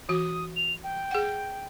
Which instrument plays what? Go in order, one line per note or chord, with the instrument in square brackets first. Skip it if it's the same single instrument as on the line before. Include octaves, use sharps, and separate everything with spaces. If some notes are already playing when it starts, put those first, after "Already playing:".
[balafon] E3 F#4 [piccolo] D#6
[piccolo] F7
G5
[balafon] G#4 F#5